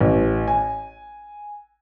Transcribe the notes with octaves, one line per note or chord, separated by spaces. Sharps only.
A1
G#5